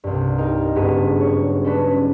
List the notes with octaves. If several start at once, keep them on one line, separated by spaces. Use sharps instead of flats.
C2 G2
D#4 G4 A#4
F#1 G2 B3 G#4 D#7
C#5
C#4 D4 B4